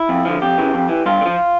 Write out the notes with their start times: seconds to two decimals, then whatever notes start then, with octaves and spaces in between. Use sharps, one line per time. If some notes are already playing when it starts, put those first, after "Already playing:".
Already playing: E4
0.09 F2
0.25 D3 F3
0.42 F2 G4
0.58 C#3 E3
0.74 F2
0.89 E3
1.06 G2 F4
1.21 D3
1.26 F3